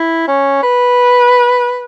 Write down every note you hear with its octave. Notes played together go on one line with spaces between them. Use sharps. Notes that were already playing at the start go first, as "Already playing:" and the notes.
Already playing: E4
C#4
B4